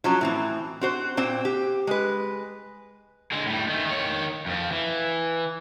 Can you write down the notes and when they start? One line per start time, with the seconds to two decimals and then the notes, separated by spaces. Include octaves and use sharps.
0.04 F3 F#3 C#4
0.21 A2 E3 C4
0.81 C4 F#4 C5
1.17 A#2 C4 C5 G5
1.45 G4
1.87 G#3 B4
3.32 D3 G#3
3.46 A2 G3
3.68 D#3 A3
3.86 D#3 C#5
4.46 F2 F3
4.71 E3